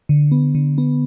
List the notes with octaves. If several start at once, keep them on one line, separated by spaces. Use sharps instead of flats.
D3
B3
D3
B3